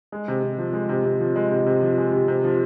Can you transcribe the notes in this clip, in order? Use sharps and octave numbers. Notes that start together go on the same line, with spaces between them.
G#3
C3
C3
F3
G#3
C3
C3
F3
G#3
C3
C3
F3
G#3
C3
C3
F3